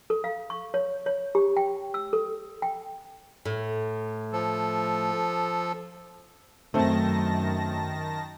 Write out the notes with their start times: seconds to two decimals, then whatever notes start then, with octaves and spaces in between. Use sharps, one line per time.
0.10 A4
0.24 F5
0.50 C#6
0.74 C#5
1.06 C#5
1.35 G4
1.57 G5
1.94 E6
2.13 A4
2.62 G5
3.45 A2
4.32 F3 A4
6.74 F#2 D#3 A3 C4 A5 A#6